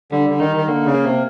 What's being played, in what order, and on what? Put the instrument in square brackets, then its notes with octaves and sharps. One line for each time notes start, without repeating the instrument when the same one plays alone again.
[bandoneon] D3 [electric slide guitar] G3
[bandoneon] D3
[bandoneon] D#3 [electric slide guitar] D#4
[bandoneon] D#3
[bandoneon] D3 [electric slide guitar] A#3
[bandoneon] C#3
[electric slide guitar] A#3
[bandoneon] C3